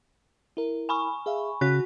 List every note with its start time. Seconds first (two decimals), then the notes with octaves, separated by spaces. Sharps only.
0.57 E4 A#4
0.89 G#5 B5 C#6
1.26 G#4 E5 F5
1.61 C#3 F#4 F#6 B6